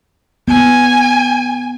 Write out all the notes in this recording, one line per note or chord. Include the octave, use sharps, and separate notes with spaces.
B3 G#5